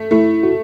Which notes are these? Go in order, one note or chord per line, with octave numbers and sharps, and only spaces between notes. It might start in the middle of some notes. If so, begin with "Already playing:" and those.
Already playing: A3
A3 E4
F#4